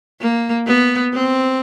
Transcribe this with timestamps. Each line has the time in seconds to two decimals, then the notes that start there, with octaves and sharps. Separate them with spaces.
0.21 A#3
0.67 B3
1.13 C4